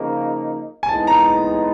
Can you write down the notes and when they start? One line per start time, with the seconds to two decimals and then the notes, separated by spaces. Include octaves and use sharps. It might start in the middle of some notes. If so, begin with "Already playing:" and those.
Already playing: C#3 F3 A#3 D#4
0.83 G#5
0.89 A2 E3 G#3 B3 D#4 A5
1.07 A#5